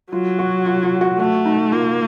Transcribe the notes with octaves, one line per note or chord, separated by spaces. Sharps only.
F#3 F4
F#4
F4
F4
F#4
A3 F#4
D#4
A#3 F4